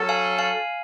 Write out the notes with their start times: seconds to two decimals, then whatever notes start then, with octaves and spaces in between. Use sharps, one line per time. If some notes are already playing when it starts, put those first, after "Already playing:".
Already playing: F#3 C#4 F#4 A4
0.09 F5 G#5
0.38 F5 G#5